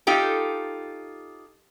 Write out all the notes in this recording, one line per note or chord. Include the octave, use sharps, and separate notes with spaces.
D#4 F4 G4 A4